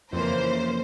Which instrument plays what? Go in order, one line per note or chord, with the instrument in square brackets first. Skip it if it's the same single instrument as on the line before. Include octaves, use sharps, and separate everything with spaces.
[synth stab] F2 [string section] C#3 E3 A#3 [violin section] C5